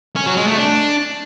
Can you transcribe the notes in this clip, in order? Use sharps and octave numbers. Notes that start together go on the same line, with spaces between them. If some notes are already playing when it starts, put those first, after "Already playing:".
C#4
F#3
G#3
A3
D4